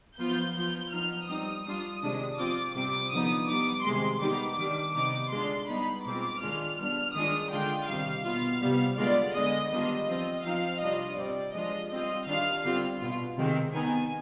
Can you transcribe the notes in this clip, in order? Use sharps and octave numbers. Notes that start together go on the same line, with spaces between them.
F3 B3 F4 G6
F3 B3 F4
F3 B3 D#4 F6
G3 C4 D#4 D#6
G3 D4 F4
C3 D#3 G#3 D4
F3 C4 F4 D6
C3 G3 C4 D6
D3 F3 B3 D#4 D#6
G3 B3 D#4 D6
C3 D#3 G#3 C6
D#3 G3 B3 D#4 D6
D#3 G3 D4
C3 D#3 B3 D#4 D6
D3 G#3 D4 F4 C6
G3 B3 D#4 B5
B2 G#3 C4 F4 D6
D#3 G#3 D4 F4 F6
G3 B3 D4 F6
D#3 G#3 D4 F4 D#6
D3 G#3 D4 F4 G5
C3 D#3 G3 F5
B2 B3 F4
C3 G3 B3
D3 G#3 B3 F4 D5
D3 G#3 B3 D#5
D#3 G3 B3 D4 F4 D#5
F3 C4 F4
F3 C4 D#4 F5
C3 G3 D4 F4 D#5
C3 G3 C4 D5
F3 G#3 D4 F4 D#5
G3 C4 F4 D#5
D#3 G3 D4 F4 F5
D3 G3 C4 F4
B2 B3 F4
C3 D#3 G#3 C4
D#3 B3 D#4 G#5